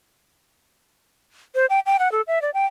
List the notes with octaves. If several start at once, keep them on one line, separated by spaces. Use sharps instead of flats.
C5
G5
G5
F#5
A4
E5
D5
G5